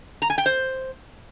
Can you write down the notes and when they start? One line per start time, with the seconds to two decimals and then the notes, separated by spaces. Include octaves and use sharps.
0.22 A#5
0.30 G#5
0.38 G5
0.46 C5